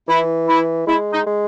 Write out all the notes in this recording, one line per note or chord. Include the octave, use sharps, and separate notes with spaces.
E3 E4
E4
G#3 E4
D#4
G#3